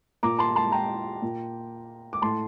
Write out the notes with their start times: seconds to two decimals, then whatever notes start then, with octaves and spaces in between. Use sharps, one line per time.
0.23 A#2 A#5 D6
0.39 A5 C6
0.56 A5 C6
0.72 G5 A#5
1.22 A#2
2.13 D6
2.22 A2 A5 C6